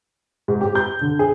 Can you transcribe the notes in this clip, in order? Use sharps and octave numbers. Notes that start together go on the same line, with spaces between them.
G#2
G4
G6
D3
G#4